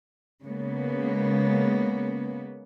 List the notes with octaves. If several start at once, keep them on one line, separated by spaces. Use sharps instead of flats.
C#3 G#3 A#3 B3